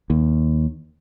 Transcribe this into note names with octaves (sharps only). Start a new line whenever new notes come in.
D#2